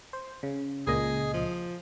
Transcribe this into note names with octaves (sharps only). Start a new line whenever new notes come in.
C5
C#3
C#2 A#2 G#4 D#5
F3